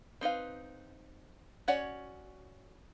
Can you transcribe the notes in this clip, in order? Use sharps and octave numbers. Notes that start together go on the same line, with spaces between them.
C4 D#4 B4 F5
C#4 F#4 C#5 D5 F#5